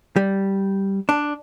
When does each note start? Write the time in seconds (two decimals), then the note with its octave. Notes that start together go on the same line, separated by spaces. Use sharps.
0.16 G3
1.09 D4